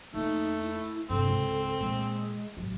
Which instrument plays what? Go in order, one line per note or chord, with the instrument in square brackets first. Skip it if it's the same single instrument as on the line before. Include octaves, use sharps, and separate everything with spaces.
[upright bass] F2 A#3 [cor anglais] A3 [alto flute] D#4
[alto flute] E4
[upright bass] G2 C3 [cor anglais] C4 [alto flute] A4
[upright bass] C#2 G#2
[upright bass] A#2 E3 [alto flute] G#3
[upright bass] A1 F#3